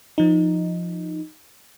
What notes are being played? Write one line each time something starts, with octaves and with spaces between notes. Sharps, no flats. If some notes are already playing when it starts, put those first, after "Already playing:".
F3 D#4